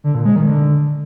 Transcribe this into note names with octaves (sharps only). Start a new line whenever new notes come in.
D3
A#2
G#3
D#3
D3